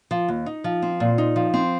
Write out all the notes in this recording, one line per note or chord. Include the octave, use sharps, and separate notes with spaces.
F3
D#2
D#4
F3
C4
A#2
D#4
F3
C4